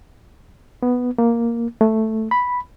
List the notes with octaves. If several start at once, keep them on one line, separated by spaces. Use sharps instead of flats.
B3
A#3
A3
B5